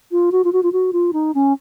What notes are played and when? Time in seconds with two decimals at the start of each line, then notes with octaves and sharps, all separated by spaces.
0.12 F4
0.32 F#4
0.44 F4
0.53 F#4
0.63 F4
0.72 F#4
0.93 F4
1.13 D#4
1.34 C#4